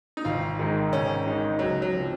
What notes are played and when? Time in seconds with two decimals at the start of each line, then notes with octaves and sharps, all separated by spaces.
0.17 D#4
0.25 G#1 F4
0.59 G#2 D#3 G#3 D#4
0.92 G#1 C#4
1.26 G#2 D#3 G#3 D#4
1.59 C#2 F#3
1.82 F#3
1.93 C3 F3